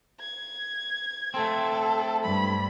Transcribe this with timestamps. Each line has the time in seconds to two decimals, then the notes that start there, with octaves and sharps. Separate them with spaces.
0.20 G#6
1.34 A3 C4 A4
2.24 G2 B5